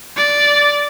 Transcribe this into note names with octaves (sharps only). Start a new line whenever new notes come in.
D5